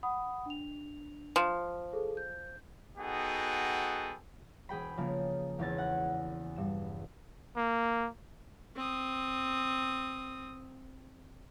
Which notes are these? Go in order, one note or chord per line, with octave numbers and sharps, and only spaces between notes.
F#5 B5 D#6
D4 F7
F3
G#4 A4 C5
G6
B3 D#4 F#4 G#4 A4 G5
E1 G#4 G5 B5
C#3 F3 A#3
E1 E2 C#4 G#6 A6
F#5
G2 E7
A#3
C4 D#6